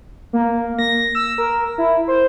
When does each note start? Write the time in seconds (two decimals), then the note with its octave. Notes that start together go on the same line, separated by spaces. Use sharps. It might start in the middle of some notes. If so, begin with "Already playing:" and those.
0.33 A#3
0.79 A#6
1.15 E6
1.38 A#4
1.78 E4
2.08 C5